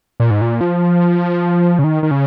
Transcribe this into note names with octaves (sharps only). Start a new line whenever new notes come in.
A#2
G#2
A#2
F3
C#3
D#3
D#3
C#3